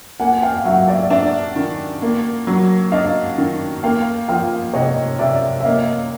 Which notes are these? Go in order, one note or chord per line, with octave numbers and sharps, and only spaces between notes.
A#3 F#5 G#5
F5 G5
F#3 E5 F#5
D5 E5
D4 D5 E5
D#3
A#3
F#3
D4 D#5 F5
D#3
A#3 F5 G5
F3 F5 G5
C3 C#5 D#5
C3 D5 E5
E5
A#3 D#5 F5